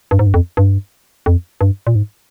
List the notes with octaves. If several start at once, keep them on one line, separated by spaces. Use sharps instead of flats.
G2
G#2
G2
F2
G2
F2
G2
A#2
G#2